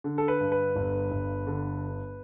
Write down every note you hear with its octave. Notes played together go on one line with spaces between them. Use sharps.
D3
A4
B4
G2
B4
G1
G1
D3